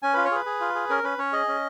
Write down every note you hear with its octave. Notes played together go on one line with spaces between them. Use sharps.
C#4 G#5
F4 B4
C#5
G#4 B4
G#4
F4
G#4
C#4 A#4
C#4 B4
C#4 C#5
G#4 D#5
C#4